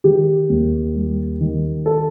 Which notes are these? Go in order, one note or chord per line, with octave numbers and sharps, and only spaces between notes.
D#3 G4
D#2
G3
D#3
A4